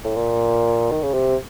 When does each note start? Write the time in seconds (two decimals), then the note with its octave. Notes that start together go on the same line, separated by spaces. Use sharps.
0.04 A2
0.16 A#2
0.92 D#3
1.03 C#3
1.14 C3